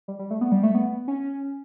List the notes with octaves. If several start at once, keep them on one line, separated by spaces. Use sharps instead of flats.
G3
G3
A3
B3
G3
A3
B3
C#4